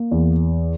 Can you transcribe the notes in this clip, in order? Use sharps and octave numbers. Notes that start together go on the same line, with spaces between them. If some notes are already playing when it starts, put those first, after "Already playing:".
Already playing: A#3
E2